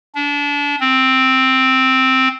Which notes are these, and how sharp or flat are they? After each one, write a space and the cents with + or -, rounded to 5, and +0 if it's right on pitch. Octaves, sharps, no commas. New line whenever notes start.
D4 -30
C4 +0